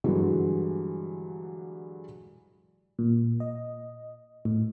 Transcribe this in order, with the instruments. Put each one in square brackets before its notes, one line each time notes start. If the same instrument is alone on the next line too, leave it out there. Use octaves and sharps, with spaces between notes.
[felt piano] G2 D3 E3 F#3 G#3
[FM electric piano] A#2
D#5
A2